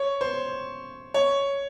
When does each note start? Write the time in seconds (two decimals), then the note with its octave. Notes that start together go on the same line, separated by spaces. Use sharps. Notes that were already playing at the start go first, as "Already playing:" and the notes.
Already playing: C#5
0.21 C5
1.14 C#5